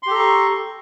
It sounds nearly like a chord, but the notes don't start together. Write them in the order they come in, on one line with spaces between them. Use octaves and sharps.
C6 G4 A4 A#5 C#6